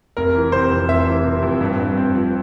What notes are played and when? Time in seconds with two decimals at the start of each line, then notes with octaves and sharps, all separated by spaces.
0.17 F1 A#4
0.35 E3
0.52 C3 C5
0.71 F2
0.88 F1 E5
1.07 E3
1.24 C3
1.42 F2
1.61 G2
1.79 G2
1.97 C4
2.15 F3